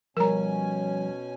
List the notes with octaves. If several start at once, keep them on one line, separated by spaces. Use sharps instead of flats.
B2 F3 G3 C#4 A#4 G#5 A#5